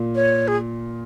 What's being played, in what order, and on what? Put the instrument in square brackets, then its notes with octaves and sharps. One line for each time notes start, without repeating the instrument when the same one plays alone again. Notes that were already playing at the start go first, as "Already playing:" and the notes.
Already playing: [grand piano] A#2
[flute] C#5
G#4